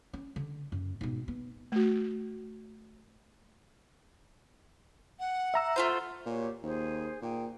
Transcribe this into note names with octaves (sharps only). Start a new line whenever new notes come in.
C#4
D3
F#2
G#2 B2
B3
A3 F#4
F#5
E5 A#5 E6
A3 F4 C5
A#2 F#4 G4 C#5
D#2 G#4 C5
A#2 G#4 G5